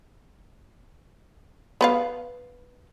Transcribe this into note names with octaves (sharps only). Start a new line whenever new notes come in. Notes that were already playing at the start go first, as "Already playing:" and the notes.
B3 B4 F5